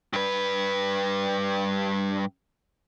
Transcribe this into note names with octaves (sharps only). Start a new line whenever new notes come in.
G2 B4